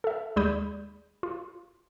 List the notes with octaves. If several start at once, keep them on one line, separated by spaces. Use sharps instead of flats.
A4 E5
D#2 G#3 D5 B5 D#6 G6
F4